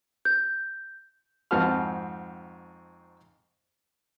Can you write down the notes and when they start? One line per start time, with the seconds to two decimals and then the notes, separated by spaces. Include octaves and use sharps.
0.25 G6
1.51 F2 G#2 C4 F#4 A5 F6